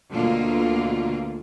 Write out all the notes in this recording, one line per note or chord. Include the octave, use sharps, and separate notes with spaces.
D2 B2 D3 A#3 F4